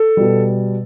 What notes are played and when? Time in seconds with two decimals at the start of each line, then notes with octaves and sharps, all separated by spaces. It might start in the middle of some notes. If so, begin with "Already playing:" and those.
Already playing: A4
0.17 B2 G3